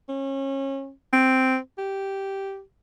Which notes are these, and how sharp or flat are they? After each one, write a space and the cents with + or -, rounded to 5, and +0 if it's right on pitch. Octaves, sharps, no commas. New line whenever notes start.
C#4 -30
C4 -5
G4 -5